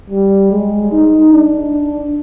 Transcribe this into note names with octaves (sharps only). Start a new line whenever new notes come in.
G3
G#3
D#4
D4